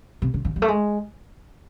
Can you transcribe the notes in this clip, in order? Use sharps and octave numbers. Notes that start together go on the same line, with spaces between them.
C3
C#3
D3
G3
A3
G#3